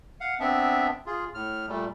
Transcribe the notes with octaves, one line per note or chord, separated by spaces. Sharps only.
F5 F#5
B3 C4 D4 E5
F4 G#4
A2 F6
A#2 G3 A3